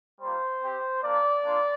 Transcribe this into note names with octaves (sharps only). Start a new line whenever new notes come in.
G3 A#3 F4 C5
C4 G4
A#3 D4 F4 D5
A#3 D4 F4